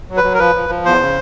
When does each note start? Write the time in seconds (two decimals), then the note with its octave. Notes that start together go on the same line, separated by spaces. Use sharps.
0.10 F#3
0.17 B4
0.24 F#3
0.34 A#4
0.39 F3 B4
0.55 F3
0.69 F3
0.85 E2 C5
1.00 C#3